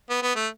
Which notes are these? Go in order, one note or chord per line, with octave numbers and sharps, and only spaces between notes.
B3
B3
A3